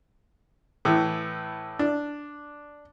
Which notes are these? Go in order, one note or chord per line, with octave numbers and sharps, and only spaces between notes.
A2 E3
D4